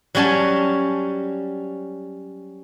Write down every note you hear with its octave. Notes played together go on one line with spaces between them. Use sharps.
F#3 G3 C#4 G#5 A5